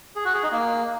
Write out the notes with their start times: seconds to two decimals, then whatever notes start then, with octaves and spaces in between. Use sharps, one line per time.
0.16 G#4
0.25 F#4
0.34 G#4
0.43 D#4
0.52 A#3